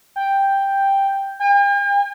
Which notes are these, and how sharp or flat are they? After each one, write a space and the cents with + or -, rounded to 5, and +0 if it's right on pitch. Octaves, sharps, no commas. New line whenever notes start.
G5 +5
G5 +45